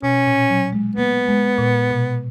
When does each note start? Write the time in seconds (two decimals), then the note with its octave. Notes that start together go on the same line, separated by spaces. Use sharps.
0.03 B2 C#4
0.27 A#2
0.50 F#3
0.73 G#3
0.96 A#3 B3
1.28 G#3
1.58 A#2
1.90 B2